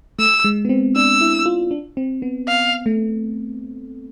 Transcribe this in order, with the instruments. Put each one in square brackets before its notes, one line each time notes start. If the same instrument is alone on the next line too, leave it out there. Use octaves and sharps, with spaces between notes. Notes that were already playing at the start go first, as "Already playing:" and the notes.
[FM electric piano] A3 [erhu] E6
[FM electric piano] G#3
B3
C4
[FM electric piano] D4 [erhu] E6
[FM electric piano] E4
F4
D4
C4
B3
[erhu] F5
[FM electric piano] A3